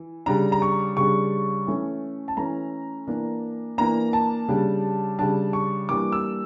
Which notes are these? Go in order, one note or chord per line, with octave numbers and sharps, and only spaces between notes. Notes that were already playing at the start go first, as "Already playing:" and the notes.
Already playing: E3
C#3 G3 D4 A#5
A#5
C#6
C#3 G3 D4 C#6
E3 A3 C#4
A5
E3 A3 C#4 A#5
E3 A#3 D4
E3 A#3 D4 A#5
A5
C#3 G3 D4
C#3 G3 D4 A5
C#6
E3 G3 A#3 D4 D6
E6